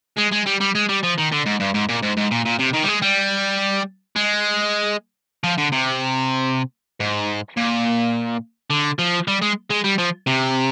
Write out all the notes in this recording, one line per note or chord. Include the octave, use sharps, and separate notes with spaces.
G#3
G#3
G3
G3
G#3
G3
F3
D#3
D3
G#2
G2
G#2
A#2
G#2
G#2
A#2
A#2
C3
D#3
G3
G#3
G3
G#3
F3
D3
C3
G#2
A#2
D3
F3
G3
G#3
G#3
G3
F3
C3